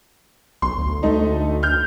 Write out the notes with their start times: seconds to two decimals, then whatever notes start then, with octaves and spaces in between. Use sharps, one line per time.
0.62 B1 C6
0.78 D2
1.03 A3 D#4
1.63 F6 G6